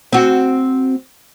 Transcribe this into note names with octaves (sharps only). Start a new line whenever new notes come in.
C4 F#4